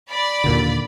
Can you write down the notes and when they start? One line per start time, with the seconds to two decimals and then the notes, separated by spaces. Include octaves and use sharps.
0.10 D5 B5
0.44 D#2 A#2 D3